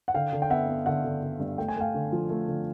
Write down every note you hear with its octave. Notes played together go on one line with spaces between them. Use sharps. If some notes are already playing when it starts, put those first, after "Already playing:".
F#5
D3 F5 G5
D3
G5
B3 E5 F#5
B3
D3 E5 F#5
D3
D3
G2
A3 G5
G#5
A3 F5 G5
D3
F3
A3
D3